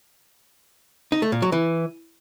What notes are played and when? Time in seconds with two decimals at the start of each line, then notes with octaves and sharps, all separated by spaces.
1.12 D#4
1.22 A3
1.32 A#2
1.42 F#3
1.52 E3